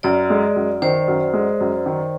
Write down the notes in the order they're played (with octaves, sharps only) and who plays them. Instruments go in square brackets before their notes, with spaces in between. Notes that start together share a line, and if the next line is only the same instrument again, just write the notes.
[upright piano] F#2 [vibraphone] D5
[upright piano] G#3
F#2
[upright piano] D#3 [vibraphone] C5
[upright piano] F#2
G#3
F#2
D#3